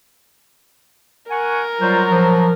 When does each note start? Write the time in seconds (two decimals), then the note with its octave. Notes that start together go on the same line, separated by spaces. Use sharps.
1.31 A#4 F#5 G#5 C#6
1.81 F#3 G3 F4 C5
2.10 F3